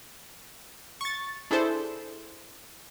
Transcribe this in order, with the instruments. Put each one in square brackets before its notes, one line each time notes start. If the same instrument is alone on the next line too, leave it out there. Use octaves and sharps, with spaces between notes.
[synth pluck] C#6 A6
D4 E4 G#4 A4 C5